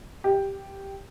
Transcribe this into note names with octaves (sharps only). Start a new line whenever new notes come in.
G4